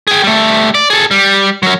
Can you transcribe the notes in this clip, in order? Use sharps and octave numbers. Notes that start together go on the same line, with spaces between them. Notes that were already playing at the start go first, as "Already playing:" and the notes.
G#4 G5
G3 A3
D5
G#4 A4
G3
F#3 A#4